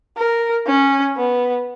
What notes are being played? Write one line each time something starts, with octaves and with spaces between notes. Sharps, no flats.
A#4
C#4
B3